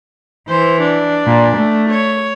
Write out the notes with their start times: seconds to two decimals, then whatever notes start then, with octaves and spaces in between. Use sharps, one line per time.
0.49 E3 C5
0.82 D4
1.26 A#2
1.57 A3
1.90 C#5